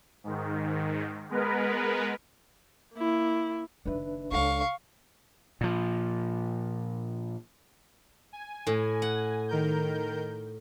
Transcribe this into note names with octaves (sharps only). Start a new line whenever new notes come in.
G#2 D#3
G#3 B3 A#4 B4
A#3 E4
F#1 D#3 D4 B4 E5
C#2 G#3 D4 A4 C#5 F5 C#6
A#2 F3
G#5
A2
F#5
D#3 A#4 G6